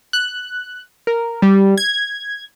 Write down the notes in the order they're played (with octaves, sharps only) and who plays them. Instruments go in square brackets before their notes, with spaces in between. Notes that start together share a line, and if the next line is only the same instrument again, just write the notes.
[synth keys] F#6
A#4
G3
G#6